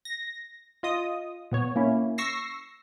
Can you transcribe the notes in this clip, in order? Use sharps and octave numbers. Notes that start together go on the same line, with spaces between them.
A#6
F4 D#5 D#6
A#2 B3 C#5
A#3 C#4 E4
C#6 E6 A#6 C7